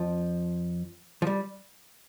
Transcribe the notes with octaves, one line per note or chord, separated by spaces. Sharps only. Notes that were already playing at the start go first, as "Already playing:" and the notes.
Already playing: F2 F3
F3
G3